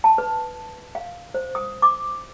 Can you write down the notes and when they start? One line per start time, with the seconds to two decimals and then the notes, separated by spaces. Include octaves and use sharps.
0.04 A5
0.18 B4
0.95 F5
1.34 C5
1.55 D#6
1.82 D6